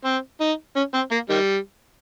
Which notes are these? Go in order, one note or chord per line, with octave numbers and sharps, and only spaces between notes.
C4
D#4
C#4
C4
A#3
D#3 G3